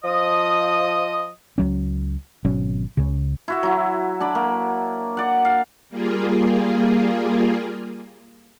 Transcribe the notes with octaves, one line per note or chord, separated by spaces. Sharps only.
F3 D#5 D#6
C#2 F#3 C#4
G#1 B2 F#3 C#4
C#2 C#3
E4 F#4 E5
F#3 E4
D4 D5 B5
A#3
D5 F#5
F5
G3 A#3 F4 G#4